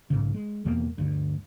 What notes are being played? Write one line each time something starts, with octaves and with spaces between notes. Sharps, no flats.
B1 G#2 C#3
G#3
E2 B2 G3 A#3
D2 G2